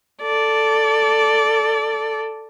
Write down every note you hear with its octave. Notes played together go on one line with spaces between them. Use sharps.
A4 D5